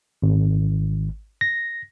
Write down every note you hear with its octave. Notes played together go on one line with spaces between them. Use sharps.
G#1
A#6